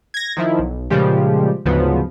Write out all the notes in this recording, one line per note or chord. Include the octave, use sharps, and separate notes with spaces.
G#6 A#6
D#3 F3 E4
B1
A#2 C#3 F3 G3 G#3 G4
D2 G#2 C#3 F3 F#3 B3